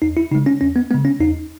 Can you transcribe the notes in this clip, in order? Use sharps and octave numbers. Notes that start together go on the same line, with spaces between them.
E2 D#4
E4
C#3 G#3 D#4
C#4
E2 C#4
B3
C#3 G#3 B3
C#4
E2 D#4